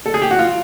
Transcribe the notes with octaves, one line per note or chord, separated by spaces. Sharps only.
A4
G#4
G4
F#4
F4